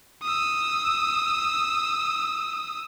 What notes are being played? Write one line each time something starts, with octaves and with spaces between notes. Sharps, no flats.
D#6 E6